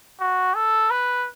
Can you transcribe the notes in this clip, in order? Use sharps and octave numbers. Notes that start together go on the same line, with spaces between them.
F#4
A4
B4